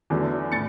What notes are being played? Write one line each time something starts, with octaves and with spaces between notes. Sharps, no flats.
E2 D3 F#3 A3
A2 A6 C#7